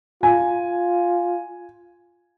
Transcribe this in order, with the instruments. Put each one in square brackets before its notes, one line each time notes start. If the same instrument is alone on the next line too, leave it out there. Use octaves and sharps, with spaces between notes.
[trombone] F4 [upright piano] G#5